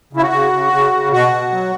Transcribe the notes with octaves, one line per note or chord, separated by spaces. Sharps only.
C#3 E4
F#4
C#3
C#3
C#3
C#3
B2 F#4
B2
F#3